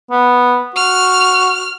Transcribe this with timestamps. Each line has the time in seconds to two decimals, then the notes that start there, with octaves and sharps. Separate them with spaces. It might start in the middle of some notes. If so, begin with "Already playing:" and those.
0.11 B3
0.76 F#4 F6